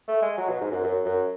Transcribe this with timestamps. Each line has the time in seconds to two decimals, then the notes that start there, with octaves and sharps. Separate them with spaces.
0.08 A3
0.22 G#3
0.38 F#3
0.49 B2
0.61 G#2
0.72 F#2
0.84 F#2
1.06 F#2